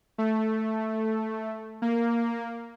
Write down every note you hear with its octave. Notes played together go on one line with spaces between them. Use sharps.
A3
A#3